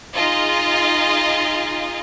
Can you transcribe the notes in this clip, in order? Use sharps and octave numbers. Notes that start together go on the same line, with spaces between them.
D#4 F4 G#4 D#5